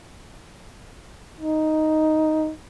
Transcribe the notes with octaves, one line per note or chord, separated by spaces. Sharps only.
D#4